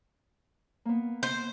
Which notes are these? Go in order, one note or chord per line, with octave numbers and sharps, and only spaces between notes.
A#3 B3
C5